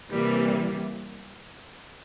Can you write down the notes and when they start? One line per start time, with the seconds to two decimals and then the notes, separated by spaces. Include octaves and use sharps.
0.11 C3 E3 G3 A#3